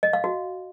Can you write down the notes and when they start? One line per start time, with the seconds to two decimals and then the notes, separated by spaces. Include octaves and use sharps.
0.03 D#5
0.13 F5
0.24 F#4